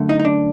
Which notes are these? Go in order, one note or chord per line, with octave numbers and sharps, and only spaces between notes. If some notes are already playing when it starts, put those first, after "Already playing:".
Already playing: F#2 D3 A3
D#4
D#4
D4